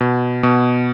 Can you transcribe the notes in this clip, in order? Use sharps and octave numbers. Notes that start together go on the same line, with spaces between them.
B2
B2